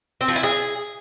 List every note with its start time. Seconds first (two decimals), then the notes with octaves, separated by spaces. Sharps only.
0.21 C4
0.28 F3
0.36 E4
0.43 G#4